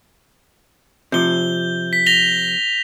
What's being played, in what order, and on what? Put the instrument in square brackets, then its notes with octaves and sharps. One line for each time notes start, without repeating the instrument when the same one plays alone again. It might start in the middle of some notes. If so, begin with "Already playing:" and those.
[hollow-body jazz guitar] C3 F3 [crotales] G6 G7
[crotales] B6
A#6 F7 G7